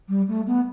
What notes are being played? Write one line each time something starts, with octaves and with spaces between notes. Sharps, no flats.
G3
A3
B3